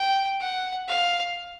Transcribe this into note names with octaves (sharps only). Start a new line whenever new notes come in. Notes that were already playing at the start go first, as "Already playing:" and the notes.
Already playing: G5
F#5
F5